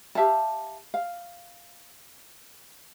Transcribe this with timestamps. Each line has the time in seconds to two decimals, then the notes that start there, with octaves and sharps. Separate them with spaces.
0.15 G4 E5 F5 A5
0.94 F5